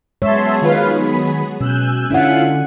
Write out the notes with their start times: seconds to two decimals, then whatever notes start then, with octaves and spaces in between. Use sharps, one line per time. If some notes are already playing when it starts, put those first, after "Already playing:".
0.22 F#3 G#3 B3 G#4 C#5 E5 A5 C6
0.62 D#3 F4 B4 F5
1.00 B5
1.61 B2 C#4 G#5 E6 F#6 G6
2.10 D3 C#4 E4 F4 F#5